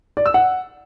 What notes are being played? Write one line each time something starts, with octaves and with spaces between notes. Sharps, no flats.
D5
E6
F#5